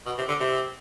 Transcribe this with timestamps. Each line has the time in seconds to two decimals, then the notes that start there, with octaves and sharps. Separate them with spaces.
0.06 B2
0.18 C3
0.28 D3
0.40 C3